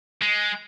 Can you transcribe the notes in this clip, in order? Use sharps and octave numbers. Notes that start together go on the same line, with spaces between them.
G#3